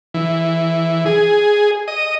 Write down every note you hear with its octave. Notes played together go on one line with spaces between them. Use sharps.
E3
G#4
D#5